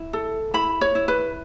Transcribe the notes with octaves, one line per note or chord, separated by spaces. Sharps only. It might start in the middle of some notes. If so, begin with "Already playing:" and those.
Already playing: E4
A4
E4 B5
C#5
E4
B4